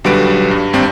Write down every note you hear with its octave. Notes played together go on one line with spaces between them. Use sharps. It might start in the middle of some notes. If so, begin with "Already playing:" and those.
B1 D3 G3 F#4 B4 D7
G2
G#1 G2 C4 D4